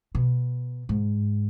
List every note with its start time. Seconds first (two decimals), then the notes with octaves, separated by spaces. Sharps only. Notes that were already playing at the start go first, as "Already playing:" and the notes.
0.15 B2
0.89 G#2